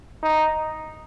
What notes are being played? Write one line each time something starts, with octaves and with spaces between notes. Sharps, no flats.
D#4